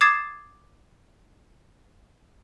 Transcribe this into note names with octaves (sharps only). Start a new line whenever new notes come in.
D6 D#6 G#6 A6 C7 E7